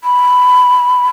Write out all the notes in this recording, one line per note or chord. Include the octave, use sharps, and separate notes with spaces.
B5